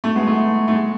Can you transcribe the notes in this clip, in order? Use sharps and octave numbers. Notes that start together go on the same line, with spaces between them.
A3
G#3 B3
A3
A3
G#3